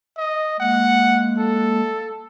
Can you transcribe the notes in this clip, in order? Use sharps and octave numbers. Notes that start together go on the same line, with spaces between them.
D#5
G#3 A#3 F#5
A4